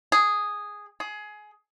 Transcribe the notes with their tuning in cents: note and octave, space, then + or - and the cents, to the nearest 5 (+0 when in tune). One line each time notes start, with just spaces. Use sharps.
G#4 -5
G#4 +20